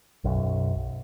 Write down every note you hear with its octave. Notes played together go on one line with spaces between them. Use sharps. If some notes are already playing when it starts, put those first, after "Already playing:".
B1 F#2